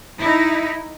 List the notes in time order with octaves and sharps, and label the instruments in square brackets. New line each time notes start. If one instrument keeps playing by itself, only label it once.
[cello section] D#4 E4